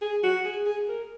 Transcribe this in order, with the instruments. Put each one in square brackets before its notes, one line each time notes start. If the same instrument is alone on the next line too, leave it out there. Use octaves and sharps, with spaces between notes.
[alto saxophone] G#4
F#4
G#4
G#4
A#4